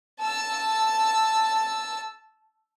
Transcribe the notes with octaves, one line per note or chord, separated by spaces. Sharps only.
A5 E6